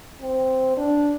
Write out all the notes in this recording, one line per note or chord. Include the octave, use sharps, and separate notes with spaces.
C4
D4